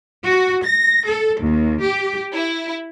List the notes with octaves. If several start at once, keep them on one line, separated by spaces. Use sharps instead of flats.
F#4
A#6
A4
D#2
G4
E4